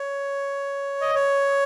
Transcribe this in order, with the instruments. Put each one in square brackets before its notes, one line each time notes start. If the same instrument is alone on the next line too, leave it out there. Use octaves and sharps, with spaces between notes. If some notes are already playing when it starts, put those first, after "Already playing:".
Already playing: [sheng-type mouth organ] C#5
D#5
C#5